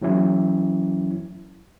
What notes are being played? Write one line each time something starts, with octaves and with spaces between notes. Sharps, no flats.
E3 F#3 C#4 E4